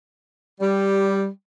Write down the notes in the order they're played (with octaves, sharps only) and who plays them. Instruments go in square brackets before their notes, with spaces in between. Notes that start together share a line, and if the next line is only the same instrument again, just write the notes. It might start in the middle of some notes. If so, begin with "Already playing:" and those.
[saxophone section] G3